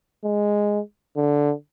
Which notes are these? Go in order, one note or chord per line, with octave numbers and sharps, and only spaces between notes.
G#3
D3